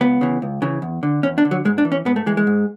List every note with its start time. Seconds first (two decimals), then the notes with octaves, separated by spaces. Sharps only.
0.01 C#2 B3
0.21 C#3 E3
0.42 C#2
0.62 C#3 E3
0.82 E2
1.03 D3
1.23 E2 C#4
1.38 D4
1.45 D3
1.51 F#3
1.65 G#2 G#3
1.78 D4
1.85 E3
1.92 C#4
2.05 G#2 B3
2.16 A3
2.26 E3 G#3
2.37 G#3
2.47 G#2